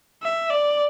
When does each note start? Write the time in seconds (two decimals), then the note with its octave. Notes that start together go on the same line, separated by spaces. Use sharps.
0.23 E5
0.50 D5